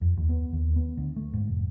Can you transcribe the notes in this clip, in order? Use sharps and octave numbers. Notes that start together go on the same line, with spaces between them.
F2
D#2
B3
D#2
B3
D2
A3
G#2
F1